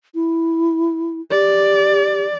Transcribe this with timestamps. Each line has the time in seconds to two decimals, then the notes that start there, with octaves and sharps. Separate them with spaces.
0.15 E4
1.31 G4 D5